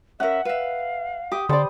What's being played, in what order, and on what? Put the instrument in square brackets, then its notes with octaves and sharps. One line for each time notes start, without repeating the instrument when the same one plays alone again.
[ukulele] C#4 A#4 [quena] E5 [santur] F#5
[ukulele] B4 E5 [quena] F5
[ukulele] G4 [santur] D#6
[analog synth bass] D3 [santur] G3 C5 [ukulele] A4 D5 [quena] C6